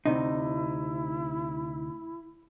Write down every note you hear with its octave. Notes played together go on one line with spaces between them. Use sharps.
D2 C3 D#4 E4